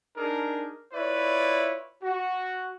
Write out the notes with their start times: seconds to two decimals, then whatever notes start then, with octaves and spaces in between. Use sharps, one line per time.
0.17 D4 D#4 G#4 A#4
0.93 E4 F4 B4 C#5 D5
2.03 F#4